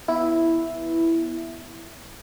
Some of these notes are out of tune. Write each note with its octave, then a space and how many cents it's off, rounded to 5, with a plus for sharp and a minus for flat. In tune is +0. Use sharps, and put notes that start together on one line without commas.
B3 +0 E4 +0